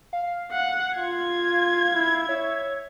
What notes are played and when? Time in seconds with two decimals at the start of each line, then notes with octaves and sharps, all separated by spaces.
0.13 F5
0.52 F#5
0.98 F4 G#6
1.94 E4
2.29 C#5 E5